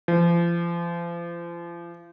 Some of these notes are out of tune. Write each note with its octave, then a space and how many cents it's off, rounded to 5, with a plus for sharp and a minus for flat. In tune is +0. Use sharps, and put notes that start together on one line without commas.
F3 -35